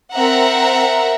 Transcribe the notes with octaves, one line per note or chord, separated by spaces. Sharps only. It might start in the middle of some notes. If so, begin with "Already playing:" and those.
C4 A#4 E5 F#5 A#5